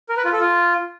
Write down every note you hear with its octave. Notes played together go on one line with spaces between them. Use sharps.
A#4
B4
F4
A4
F4